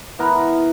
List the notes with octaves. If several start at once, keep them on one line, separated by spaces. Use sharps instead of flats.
E3 B3 A#4